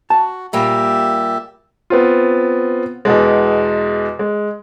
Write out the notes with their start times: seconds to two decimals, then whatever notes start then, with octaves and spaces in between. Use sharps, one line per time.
0.10 F#4 A5
0.53 A#2 G3 A#3 G4 E5
1.90 B3 C4 F4
3.05 E2 B2 G#3
4.19 G#3